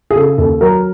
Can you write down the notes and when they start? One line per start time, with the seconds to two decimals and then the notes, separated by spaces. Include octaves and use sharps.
0.11 G#4
0.16 C#3 A4
0.38 D#2 A4
0.61 F#3 A#4